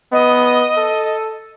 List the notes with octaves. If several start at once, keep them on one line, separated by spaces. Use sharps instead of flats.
B3 D#5
A4